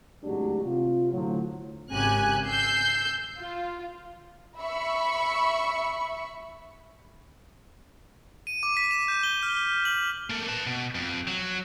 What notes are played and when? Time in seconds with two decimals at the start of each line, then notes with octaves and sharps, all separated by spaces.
0.24 G#1 A2 F#3 G#3 D4 G4
0.64 C3 F4
1.13 A2 D3 F3 F#3
1.90 G#1 C#3 G4 G#5 F#6
2.46 E6 G6 C7
3.39 F4
4.60 E5 B5 C#6
8.47 D#7
8.63 D6
8.77 B6
8.91 E7
9.08 G6
9.23 G7
9.43 F6
9.85 F#7
10.30 A#3 A4
10.48 B4 A5
10.67 B2
10.95 F2
11.27 F#3